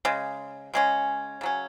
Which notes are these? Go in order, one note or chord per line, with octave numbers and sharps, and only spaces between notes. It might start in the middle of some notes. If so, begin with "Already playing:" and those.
C#3 G#3
C#3 G#3 C#4
C#3 F#3 C#4